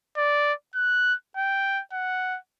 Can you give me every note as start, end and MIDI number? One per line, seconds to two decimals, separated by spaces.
0.17 0.53 74
0.75 1.14 90
1.37 1.81 79
1.93 2.38 78